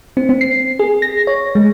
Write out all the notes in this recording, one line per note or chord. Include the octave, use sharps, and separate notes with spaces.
C4
C4
C7
G#4
A#6
C#5
G#3